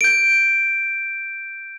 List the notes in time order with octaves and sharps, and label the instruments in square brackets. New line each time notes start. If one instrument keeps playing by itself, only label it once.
[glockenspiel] G6 D7